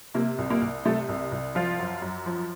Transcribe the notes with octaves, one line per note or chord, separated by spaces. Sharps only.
C3 A#3
C2
A#3
C2
C3 A3
C2
C2
F3 F4
F#2
F#2
F3